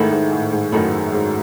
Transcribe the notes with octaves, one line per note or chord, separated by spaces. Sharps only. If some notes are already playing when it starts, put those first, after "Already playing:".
Already playing: G#2 D#3 A3 E4
G#2
A2
G#2
F#2 D#3 A3 E4
G#2